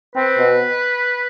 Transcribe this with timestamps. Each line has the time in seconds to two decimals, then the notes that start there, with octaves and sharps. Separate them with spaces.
0.14 C4 B4
0.37 B2